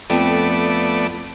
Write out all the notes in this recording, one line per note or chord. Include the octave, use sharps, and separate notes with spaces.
F2 A3 B3 D5